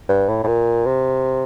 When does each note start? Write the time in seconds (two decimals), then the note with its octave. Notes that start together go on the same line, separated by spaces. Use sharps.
0.09 G2
0.29 A2
0.43 A2
0.47 A#2
0.86 C3